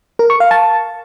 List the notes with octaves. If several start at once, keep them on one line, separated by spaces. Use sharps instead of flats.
A#4
C#6
F5
A5